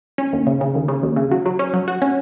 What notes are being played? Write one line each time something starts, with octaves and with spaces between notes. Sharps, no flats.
C#4
D#2
C#3
C#3
D#2
C#3
D#2
C#3
F#3
F#3
C#4
F#3
F#4
C#4